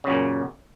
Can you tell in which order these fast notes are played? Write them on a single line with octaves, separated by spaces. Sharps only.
C#3 F#2 A#2